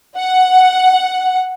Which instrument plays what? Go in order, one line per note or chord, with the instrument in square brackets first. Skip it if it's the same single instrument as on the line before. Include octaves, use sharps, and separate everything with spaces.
[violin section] F#5